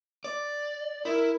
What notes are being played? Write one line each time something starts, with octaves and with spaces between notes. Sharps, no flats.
D5
E4 A#4